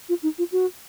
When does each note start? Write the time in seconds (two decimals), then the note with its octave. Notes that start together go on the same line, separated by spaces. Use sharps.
0.09 F4
0.23 D#4
0.38 F4
0.52 F#4